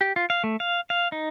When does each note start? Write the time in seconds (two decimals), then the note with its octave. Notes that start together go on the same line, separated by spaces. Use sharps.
0.01 G4
0.16 F4
0.30 F5
0.44 A3
0.60 F5
0.90 F5
1.12 D#4